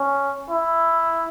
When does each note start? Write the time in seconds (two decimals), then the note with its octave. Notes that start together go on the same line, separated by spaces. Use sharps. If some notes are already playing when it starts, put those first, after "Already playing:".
Already playing: C#4
0.50 E4